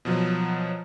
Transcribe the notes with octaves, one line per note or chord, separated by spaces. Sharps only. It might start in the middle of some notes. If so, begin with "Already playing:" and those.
B2 F3 F#3